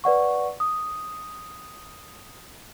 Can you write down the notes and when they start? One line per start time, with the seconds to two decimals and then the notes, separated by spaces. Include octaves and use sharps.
0.04 B4 D5 F#5 C#6
0.60 D#6